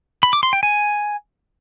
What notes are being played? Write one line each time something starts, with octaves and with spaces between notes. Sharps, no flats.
B5
D6
C6
G5
G#5